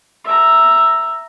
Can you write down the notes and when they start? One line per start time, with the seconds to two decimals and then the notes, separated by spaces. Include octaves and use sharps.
0.25 E5 A#5